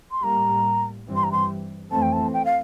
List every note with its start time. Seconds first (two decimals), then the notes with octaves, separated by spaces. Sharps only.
0.11 C6
0.23 A2 G3 A#3 A#5
1.08 G2 E3 G3 C4
1.16 C6
1.24 A#5
1.32 C6
1.91 F2 E3 A3 C4 A5
2.02 G5
2.13 A5
2.33 G5
2.45 F5